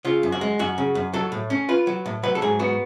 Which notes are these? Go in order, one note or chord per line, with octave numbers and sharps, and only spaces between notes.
C#3 F4
F#2
F#4
G#3
F#2 F#4
C#3
F#2
F#3 A4
A2
C#4
F4 B4
F#3
A2
F#3 B4
A4
G#2 G#4
B3 F#4